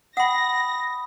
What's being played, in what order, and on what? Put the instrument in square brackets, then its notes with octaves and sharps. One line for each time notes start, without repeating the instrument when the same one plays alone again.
[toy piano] F#5 G5 [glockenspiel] B5 D#6 [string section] A#6